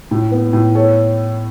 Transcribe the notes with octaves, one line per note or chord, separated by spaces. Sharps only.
A2
B3
A2
A4 C#5